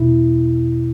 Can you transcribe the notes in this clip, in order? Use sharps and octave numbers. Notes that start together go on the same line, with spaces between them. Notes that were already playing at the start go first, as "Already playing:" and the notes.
Already playing: E2 B2 E4